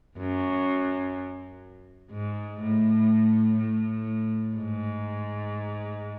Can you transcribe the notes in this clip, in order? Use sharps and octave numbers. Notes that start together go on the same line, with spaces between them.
F#2
G#2
A2
A2
G#2